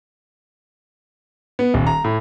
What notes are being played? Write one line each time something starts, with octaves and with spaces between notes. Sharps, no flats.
B3
D#1
A#5
A2